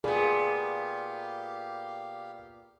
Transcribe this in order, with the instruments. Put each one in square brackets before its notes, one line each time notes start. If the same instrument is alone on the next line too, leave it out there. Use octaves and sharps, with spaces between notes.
[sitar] A#2 B3 [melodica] G4 F5 [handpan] G#4 [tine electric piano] A#4 D5 B5